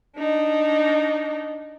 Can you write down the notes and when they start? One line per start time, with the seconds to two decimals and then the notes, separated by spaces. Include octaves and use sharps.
0.17 D4 D#4